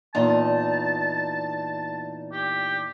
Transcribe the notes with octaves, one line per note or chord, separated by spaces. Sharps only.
E2 A#2 D#4 A5
G4